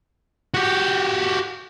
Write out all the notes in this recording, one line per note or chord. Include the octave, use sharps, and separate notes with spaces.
F#4 G4